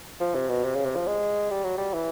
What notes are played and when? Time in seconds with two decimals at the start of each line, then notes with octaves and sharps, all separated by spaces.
0.21 F3
0.35 C3
0.49 B2
0.64 C3
0.75 C#3
0.86 C3
0.96 F3
1.07 G#3
1.50 G3
1.64 F#3
1.78 G3
1.94 E3